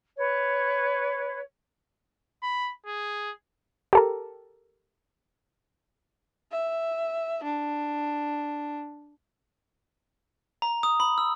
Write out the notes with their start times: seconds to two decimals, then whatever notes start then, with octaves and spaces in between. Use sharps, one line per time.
0.17 B4 C#5
2.43 B5
2.86 G#4
3.93 G4 A4 A#4
6.51 E5
7.43 D4
10.62 A#5
10.83 D#6
11.00 B5
11.18 E6